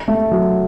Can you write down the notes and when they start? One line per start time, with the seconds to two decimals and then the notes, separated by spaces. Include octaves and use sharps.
0.08 A3
0.31 F#3